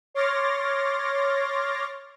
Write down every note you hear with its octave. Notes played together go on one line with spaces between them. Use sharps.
C#5 C6 D6 F6 A6 A#6